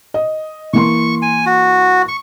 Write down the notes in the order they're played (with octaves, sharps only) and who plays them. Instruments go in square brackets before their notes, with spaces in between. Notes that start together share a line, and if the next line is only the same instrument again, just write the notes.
[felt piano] D#5
[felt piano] E3 A#3 C6 [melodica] C#6
[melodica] G#5
F#4
C#6